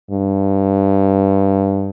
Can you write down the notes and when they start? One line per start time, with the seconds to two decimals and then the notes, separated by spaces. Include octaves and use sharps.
0.10 G2